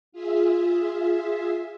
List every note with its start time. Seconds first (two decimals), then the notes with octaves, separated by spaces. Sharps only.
0.12 F4 G#4 E5